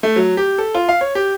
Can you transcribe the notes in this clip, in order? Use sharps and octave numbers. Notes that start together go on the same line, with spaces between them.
A3
F#3
G4
A4
F4
F5
C#5
G4